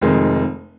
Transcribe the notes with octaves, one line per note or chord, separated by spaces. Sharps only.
F1 F2 D#3 G#3